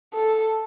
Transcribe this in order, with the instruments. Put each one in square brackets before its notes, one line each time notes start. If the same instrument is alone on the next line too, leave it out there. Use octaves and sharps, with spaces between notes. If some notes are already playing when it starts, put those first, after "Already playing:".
[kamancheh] A4